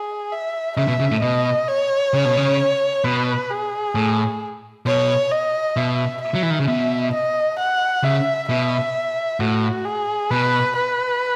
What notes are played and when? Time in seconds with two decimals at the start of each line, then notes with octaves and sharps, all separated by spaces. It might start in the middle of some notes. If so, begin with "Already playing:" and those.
Already playing: G#4
0.32 E5
0.77 C#3 E5
0.88 B2
1.00 C#3
1.11 A2
1.22 B2 D#5
1.68 C#5
2.14 C#3
2.25 B2
2.37 C#3
3.04 B2 B4
3.50 G#4
3.95 A2
4.86 B2 C#5
5.31 D#5
5.77 B2 E5
6.21 E5
6.35 F#3
6.43 E3
6.51 D#3
6.60 C#3
6.67 B2 E5
7.13 D#5
7.59 F#5
8.04 C#3 E5
8.49 B2 E5
9.40 A2 F#4
9.85 G#4
10.31 B2 B4
10.76 B4